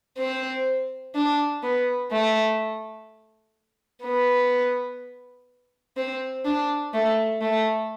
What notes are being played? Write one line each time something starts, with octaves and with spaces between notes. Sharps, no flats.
C4
D4
B3
A3
B3
C4
D4
A3
A3